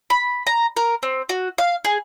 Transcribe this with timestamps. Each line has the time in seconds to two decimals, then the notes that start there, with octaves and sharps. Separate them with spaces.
0.10 B5
0.47 A#5
0.77 A#4
1.03 C4
1.29 F#4
1.58 F5
1.85 G#4